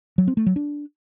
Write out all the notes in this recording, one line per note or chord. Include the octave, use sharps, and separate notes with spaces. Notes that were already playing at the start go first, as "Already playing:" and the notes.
F#3
C4
A3
F#3
D4